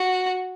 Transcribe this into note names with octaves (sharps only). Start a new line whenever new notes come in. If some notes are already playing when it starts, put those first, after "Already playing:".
Already playing: F#4